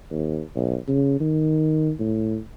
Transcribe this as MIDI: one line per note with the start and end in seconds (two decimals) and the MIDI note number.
0.10 0.41 39
0.56 0.76 35
0.88 1.16 49
1.20 1.92 51
2.00 2.37 45